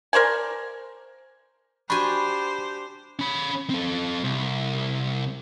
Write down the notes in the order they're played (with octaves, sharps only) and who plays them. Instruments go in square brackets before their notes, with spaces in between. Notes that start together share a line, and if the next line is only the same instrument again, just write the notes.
[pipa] A#4 C5 D5 G#5
[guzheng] D4 G#5 [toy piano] F#4 C#6 [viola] G4 C5 [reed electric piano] B5
[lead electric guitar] C#4 B5
C4 A4
C2